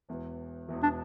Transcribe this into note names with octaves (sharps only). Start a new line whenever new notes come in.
E1 E2 E3
E1 E2 E3
D4